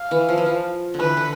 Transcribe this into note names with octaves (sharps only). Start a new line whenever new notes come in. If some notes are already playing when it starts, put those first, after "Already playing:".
Already playing: F5
E3
F3
E3
F3
D3
E3 B4
D3